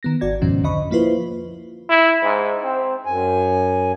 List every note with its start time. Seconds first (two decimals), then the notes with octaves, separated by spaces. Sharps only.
0.03 D#3 B3 A#6
0.21 G#1 F#4 D5 G#6
0.42 F2 G#2 B2 D#3 F3 C#4
0.63 C2 F2 D3 D#5 B5 C#6
0.90 F3 A#3 E4 F4 B4 C5
1.89 E4
2.23 G#2
2.63 C4
3.05 F#2 G#5